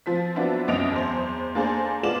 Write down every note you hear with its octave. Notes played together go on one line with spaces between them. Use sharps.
F3 C4 B6
F#3 B3 C4 D4 E4
C2 F#2 D#5 D7 F7
E2 C5
A#3 D4 G#4 A4 C5
G#3 B3 F4 D5 E7 F#7